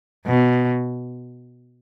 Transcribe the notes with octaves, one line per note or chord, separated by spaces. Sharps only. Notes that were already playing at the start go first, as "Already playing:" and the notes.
B2